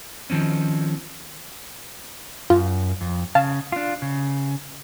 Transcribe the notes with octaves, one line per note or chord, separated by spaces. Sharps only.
D#3 F3 C4 C#4
F#2 F4
F2
C#3 F5 A5
D4 F4
C#3